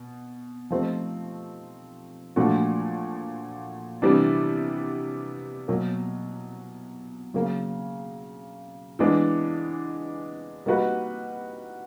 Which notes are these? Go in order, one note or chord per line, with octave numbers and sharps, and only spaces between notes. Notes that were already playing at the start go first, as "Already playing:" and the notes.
Already playing: B2
F3 A3 C4 D#4 G4
A#2 F3 A3 D4 F#4
C3 E3 G3 B3 D4
B2 F#3 A#3
C#3 F#3 A#3
E3 G#3 B3 D4
G3 A#3 D#4 F#4 B4